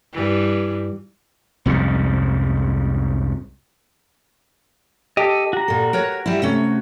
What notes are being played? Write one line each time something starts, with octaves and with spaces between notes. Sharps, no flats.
G2 E3
C2 F2 G#2 C#3
G4 A4 D#5
F#4 A#5
A#2 A4
A#4 B4 C#5
G3 E4
C3 A3 C#4